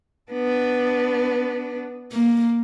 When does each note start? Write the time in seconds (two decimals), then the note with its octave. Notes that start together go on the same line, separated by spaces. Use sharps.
0.32 B3 D4
2.12 A#3